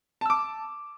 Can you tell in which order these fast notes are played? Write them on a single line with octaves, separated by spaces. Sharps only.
A5 E6 D6